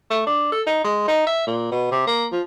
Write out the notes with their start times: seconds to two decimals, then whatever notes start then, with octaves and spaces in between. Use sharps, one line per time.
0.10 A3
0.27 D4
0.52 A4
0.67 D#4
0.84 G#3
1.08 D#4
1.27 E5
1.47 A#2
1.71 B2
1.91 C3
2.07 A#3
2.32 F3